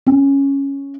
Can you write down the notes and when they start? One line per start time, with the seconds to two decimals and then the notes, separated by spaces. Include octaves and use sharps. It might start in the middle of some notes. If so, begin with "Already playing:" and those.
0.06 C#4